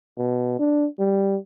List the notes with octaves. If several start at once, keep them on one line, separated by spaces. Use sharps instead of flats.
B2
D4
G3